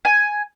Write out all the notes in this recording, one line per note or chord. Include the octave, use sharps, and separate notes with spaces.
G#5